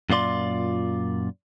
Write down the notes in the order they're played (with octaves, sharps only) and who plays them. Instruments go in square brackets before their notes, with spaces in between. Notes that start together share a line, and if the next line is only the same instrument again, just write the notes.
[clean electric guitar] F#2 A#2 F4 D5 C6